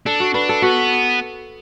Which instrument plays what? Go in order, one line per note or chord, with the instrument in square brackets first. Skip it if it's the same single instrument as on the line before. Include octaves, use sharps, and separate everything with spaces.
[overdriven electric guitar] D4 [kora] A4
[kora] F#4
[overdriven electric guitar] D4 [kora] B4
[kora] A4
[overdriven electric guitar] B3 [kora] F#4